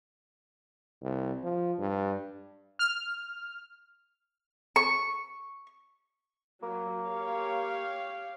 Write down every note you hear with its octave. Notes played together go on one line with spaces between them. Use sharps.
C2
F3
G2
F6
C#6
F#3 A#3
G4 C#5 F5